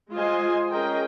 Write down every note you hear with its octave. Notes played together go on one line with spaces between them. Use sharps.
G#3 F4 C5 D#5 G#5 C6
C#4 G#4 A#4 D#5 G5